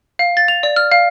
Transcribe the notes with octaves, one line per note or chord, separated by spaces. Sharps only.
F5
A6
F7
D5
F6
F5